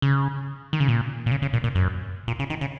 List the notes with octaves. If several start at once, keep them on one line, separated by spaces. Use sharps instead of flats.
C#3
D#3
C#3
A#2
A#2
C#3
C#3
A#2
A#2
F#2
A#2
C#3
D#3
C#3